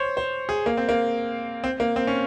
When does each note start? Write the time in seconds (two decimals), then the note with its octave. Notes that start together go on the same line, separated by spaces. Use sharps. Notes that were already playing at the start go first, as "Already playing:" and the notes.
Already playing: C5 C#5
0.17 C5
0.49 G#4
0.66 A#3
0.77 C4
0.89 A#3
1.64 C4
1.80 A#3
1.96 C4
2.07 C#4